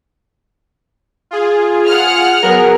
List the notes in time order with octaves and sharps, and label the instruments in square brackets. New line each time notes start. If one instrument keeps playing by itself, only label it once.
[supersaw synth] F4 G#4
[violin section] F#5 F6
[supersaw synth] F#3 B3 G#4 [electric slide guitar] A#4